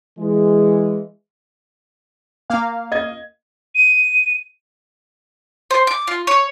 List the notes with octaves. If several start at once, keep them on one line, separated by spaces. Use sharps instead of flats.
E3 G#3
A#3 F5
D#5 G#6
D#7
C5
D6
F4
C#5